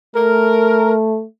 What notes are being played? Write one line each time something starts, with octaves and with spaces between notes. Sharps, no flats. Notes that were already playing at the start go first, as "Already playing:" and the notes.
A3 A#4